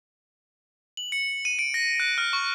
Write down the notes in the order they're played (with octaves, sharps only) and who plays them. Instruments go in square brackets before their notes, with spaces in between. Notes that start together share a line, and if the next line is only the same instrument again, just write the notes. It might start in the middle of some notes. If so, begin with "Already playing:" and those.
[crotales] F#7
C#7
D#7
D7
A#6
F#6
F6
C#6